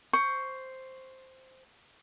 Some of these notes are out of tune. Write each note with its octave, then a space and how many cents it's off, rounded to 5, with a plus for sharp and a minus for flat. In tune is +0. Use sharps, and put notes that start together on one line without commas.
C5 +0 C#6 +10